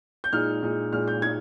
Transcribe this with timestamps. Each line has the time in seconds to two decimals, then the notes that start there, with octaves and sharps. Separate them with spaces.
0.24 G6
0.33 A#2 G#3 D#4 F6
0.62 A#2 G#3 D#4
0.93 A#2 G#3 D#4 F6
1.08 G6
1.22 A#2 G#3 D#4 G#6